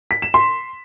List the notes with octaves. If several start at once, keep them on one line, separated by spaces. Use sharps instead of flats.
B6
E7
C6